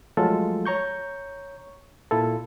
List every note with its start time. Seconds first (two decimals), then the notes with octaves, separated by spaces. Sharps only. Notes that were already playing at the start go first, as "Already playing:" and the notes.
0.17 F3 F#3 G#3 A3 F4 A4
0.66 C#5 A#5 C#6 G6
2.11 A#2 E4 F4 A4